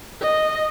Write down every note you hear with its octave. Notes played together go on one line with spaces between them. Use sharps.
D#5